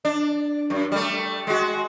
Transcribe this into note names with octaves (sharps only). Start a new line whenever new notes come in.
D4
F#2
G3 A3
G#3 F#4